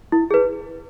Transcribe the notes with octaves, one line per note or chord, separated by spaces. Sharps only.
E4
G#4 B4